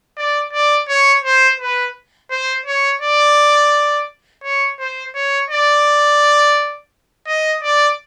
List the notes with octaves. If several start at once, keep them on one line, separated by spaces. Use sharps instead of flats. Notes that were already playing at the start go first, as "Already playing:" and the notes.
D5
D5
C#5
C5
B4
C5
C#5
D5
C#5
C5
C#5
D5
D#5
D5